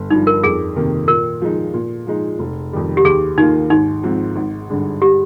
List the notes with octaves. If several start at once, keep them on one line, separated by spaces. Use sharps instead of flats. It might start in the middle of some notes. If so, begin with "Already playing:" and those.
Already playing: G1
G2 F3 D#4
A#4
F2 G#4
C3 D#3 A#3
A#2 A#4
F3 G#3 D#4
A#2
F3 G#3 D#4
F1
F2 D#3 G3
G4
D#2 G#4
D#3 A#3 D#4 F4
G#1 D#4
G#2 F3 C4
G#1
G2 D3 G#3
G4